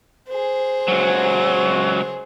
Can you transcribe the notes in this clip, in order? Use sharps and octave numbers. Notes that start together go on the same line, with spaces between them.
G#4 C5
C#2 F#3